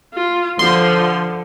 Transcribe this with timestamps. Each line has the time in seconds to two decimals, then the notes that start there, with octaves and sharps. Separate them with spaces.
0.14 F4
0.59 D3 F3 C6